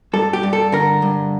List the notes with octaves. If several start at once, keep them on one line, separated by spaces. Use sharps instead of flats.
G2 A4
G4
G2
A4
D3 A#4
G2